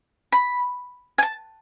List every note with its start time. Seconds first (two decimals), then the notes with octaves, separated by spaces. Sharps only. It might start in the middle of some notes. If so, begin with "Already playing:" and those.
0.32 B5
1.18 G#5
1.23 A5